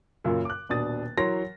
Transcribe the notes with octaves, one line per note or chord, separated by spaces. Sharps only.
F#2 A#2 C#3
D6 F#6
D#1 B2 D4 D#6 A6
E3 F#3 A#4 C#5 C6 A#6